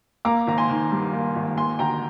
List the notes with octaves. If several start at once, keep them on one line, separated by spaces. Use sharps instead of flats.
A#3 A#5 D6
G#1 A#5
G#5 C6
D#3
G2
A#3
G#1
A#3 G#5 C6
D2 G5 A#5